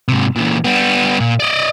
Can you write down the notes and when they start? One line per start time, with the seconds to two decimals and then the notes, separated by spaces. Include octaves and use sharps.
0.08 G#2 C3
0.36 A#2 E3
0.64 G3 B3
1.20 A#2
1.40 D5 D#5